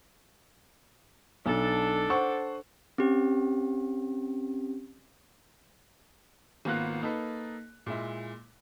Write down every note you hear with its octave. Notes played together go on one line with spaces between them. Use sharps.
B1 D4 A4
C5 F#5 C#6
C4 C#4 G4
G#1 A#3 B3 F4 F#6
A#3 D#4 A4 B4
A#2 G#3 E4